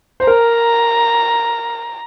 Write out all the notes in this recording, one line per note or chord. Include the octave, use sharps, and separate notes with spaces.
C5
A#4 A#5